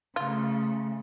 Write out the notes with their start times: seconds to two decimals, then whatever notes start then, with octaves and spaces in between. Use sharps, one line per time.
0.16 C#3 A3 F4